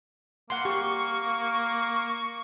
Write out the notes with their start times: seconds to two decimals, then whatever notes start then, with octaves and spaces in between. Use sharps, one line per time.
0.50 A#3 F#5 C6
0.65 G4 C#6